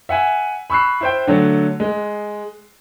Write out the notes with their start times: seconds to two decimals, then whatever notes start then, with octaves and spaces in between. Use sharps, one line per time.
0.09 E5 F#5 G#5
0.70 B5 C#6 E6 F#6 C7
1.01 E4 C5 G5
1.27 D3 F#3 A3
1.80 G#3